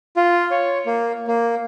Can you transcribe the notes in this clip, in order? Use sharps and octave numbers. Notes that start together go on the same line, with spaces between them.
F4
C#5
A#3
A#3